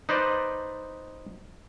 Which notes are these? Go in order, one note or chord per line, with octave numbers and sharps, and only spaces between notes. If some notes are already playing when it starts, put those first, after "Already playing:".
D#4 B4 C5 D5 D#5